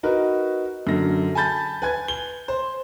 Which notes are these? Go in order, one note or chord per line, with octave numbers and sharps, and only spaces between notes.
D#4 F#4 A#4 B4
F#2 D3 A#6
G#5 A5 B5 G6 A6
B4 G#5 G#6
G7
C5